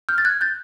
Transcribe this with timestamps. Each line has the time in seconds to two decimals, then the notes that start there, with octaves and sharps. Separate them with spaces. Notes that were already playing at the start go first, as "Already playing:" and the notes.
0.09 F6 G6
0.18 A6
0.25 F#6 G#6
0.41 G6 A6